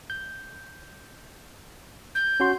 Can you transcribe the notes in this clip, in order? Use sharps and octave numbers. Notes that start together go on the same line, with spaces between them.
G6
G6
C#4 F#4 C6